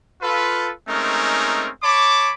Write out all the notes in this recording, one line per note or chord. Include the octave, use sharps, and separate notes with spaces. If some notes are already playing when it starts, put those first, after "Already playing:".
F4 A4 B4
G#3 A3 C4 C#4 D#4 A#4
C#5 A5 B5 D6